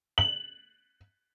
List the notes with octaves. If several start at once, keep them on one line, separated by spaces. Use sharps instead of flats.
F#7